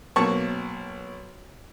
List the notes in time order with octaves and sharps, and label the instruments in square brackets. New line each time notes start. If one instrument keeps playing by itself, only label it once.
[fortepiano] B1 A#3 A5 C#6